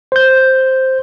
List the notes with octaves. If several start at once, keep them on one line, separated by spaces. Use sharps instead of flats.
C5 G6